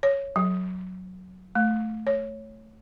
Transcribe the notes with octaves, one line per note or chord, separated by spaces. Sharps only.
C#5
F#3
A3
C#5